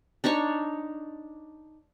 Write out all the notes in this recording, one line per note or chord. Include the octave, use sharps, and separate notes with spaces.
D4 D#4 C#5 C#6